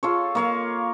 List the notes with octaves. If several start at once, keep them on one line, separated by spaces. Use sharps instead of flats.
F4 A4 C#5
A#3 C#5 F5